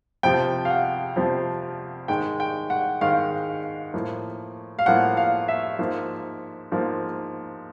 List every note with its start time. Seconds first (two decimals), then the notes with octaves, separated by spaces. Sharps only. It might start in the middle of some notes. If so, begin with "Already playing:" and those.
0.23 F2 C3 F3 G5
0.65 F5
0.70 F#5
1.16 F2 C3 F3
2.08 G#2 D#3 G#3 G5
2.40 G5
2.70 F#5
3.01 G#2 D#3 G#3 F5
3.94 A2 F3 A#3
4.79 F5
4.86 A2 F3 A#3 F#5
5.17 F5
5.48 E5
5.79 G#2 F3 A#3
6.72 G#2 F3 A#3